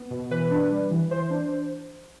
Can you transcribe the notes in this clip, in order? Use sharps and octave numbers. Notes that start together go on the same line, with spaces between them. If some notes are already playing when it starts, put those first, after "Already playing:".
Already playing: B3
B2
E3 B4
D4
G3
E3
E3 C5
D4